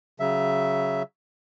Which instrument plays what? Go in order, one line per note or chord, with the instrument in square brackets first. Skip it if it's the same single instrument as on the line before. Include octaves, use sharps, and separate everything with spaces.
[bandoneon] C#3 F#3 E5